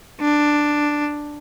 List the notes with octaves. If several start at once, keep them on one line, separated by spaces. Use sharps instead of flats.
D4